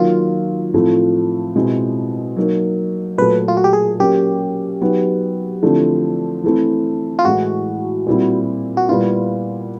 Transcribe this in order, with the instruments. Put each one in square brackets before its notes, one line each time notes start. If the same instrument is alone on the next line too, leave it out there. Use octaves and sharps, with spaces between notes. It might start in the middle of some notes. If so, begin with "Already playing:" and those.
Already playing: [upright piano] D#3 F#3 A#3 [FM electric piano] F4
[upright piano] A2 F3 A3 C4
B2 G#3 C4 E4
F#3 A#3 D#4
[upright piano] A#2 F#3 A3 [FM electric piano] B4
[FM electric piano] F4
F#4
G4
G#4
[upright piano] F#3 A#3 C#4 [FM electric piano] G4
[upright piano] F#3 B3 D#4
D3 F3 A3 C4 E4
E3 A3 C4 E4
[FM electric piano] F4
[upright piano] A2 E3 G#3 [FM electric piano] F#4
[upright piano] A#2 G3 C4 E4
[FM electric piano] F#4
[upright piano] A#2 G3 B3 E4 [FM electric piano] F4